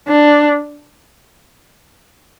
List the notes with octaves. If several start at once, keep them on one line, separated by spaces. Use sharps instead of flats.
D4